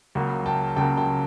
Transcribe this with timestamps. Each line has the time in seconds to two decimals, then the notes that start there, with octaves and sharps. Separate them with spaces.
0.15 C#2 C#3 F#3 A#3
0.46 G5 A5
0.76 C#2 C#3 F#3 A#3 G5 A5
0.97 G5 A5